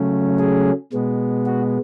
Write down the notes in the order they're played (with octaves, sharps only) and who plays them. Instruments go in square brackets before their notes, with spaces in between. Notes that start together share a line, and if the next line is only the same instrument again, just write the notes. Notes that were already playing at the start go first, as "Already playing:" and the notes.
Already playing: [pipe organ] C#3 F#3 A3 C#4
G#4
B2 G#3 B3
F#4